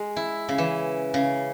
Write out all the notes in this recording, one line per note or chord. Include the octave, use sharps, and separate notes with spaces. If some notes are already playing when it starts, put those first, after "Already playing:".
Already playing: G#3
E4
C#3
E3
C#3